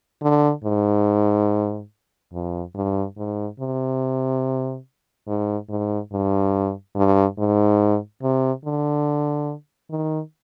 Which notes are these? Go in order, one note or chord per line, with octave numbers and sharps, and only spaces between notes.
D3
G#2
F2
G2
G#2
C3
G#2
G#2
G2
G2
G#2
C3
D3
D#3